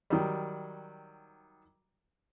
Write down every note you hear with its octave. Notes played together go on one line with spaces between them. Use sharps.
D#3 F#3 G3